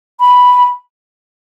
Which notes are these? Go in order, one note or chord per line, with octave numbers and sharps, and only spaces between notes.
B5